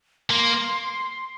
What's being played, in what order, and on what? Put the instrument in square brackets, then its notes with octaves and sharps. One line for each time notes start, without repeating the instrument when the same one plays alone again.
[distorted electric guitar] A#3 [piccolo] C6